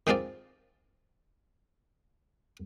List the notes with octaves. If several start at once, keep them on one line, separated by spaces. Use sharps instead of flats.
D#3 G#3 C4 F4 D5